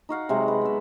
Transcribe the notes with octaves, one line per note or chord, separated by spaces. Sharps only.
D#4 F#4 F5 F#5
C3 F#3 G#3
B4
B3 E5